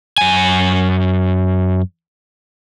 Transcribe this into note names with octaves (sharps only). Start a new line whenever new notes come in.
F#2 G#5